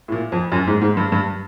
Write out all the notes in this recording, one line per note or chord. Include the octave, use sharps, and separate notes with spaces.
A2
A#2
F2
F#2
G#2
G#2
G2
G2